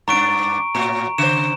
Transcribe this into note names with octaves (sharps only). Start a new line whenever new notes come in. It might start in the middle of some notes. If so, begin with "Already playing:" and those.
G2 D4 A#5 C#6 D7
A2 F#4 A#5
C#3 C5 E7